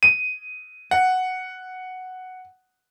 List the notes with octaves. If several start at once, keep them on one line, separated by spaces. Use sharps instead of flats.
D#7
F#5